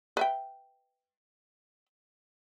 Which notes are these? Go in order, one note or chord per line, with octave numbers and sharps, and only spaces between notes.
B4 E5 G5